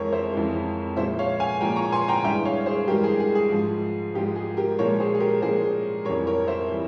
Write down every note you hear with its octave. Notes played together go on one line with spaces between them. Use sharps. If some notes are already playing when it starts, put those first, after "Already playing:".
Already playing: F2 E3 G#3 A#4 C#5
C5 E5
F2 E3 G#3
A#2 F3 G#3 C5 E5
C#5 F5
F5 G#5
A#2 F3 G#3 G5 A#5
A#5 C#6
G#5 C6
G5 A#5
G2 E3 G#3 E5 G5
C#5 F5
C#5
G#4 C5
G2 E3 G#3 G4 A#4
G#4
G#4
G#4
G#2 F3 G#3
G#2 F3 G#3 G4
G#4
G4 A#4
A#2 F3 G#3 A#4 C#5
G#4 C5
G#4
G4 A#4
A#2 F3 G#3 G#4 C5
F2 E3 G3 A#4 C#5
A#4 C#5
C5 E5
E3 G3